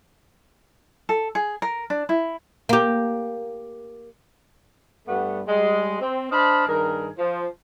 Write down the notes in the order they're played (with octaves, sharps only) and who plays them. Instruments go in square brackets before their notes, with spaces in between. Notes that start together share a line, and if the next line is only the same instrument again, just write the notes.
[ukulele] A4
G#4
A#4
D4
E4
[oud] A#3 G4
[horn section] G2 G3 A3 B3 F#5
G3 G#3 C6
C4
D4 C5 D#5 F5 A5 B5
G2 D#3 G#4 A#4
F3